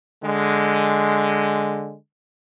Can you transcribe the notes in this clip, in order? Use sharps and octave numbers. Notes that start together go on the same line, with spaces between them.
D3 G#3